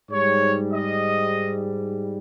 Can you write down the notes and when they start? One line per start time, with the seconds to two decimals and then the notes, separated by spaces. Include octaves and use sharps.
0.11 G#2 G3 C#5
0.72 D#5